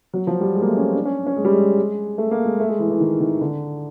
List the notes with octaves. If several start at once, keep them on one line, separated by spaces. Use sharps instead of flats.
F#3
F3
G3
G#3
A#3
A3
C#4
C4
D4
C#4
C#4
G#3
G3
G#3
A3
A#3
G#3
A3
G#3
E3
E3
D#3
D#3
D3